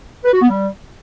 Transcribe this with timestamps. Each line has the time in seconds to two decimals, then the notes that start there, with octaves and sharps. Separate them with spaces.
0.24 B4
0.33 F#4
0.41 B3
0.49 G3